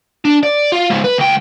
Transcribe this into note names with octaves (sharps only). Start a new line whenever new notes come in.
D4
D5
F4
C#2 G#2
B4
C#2 G5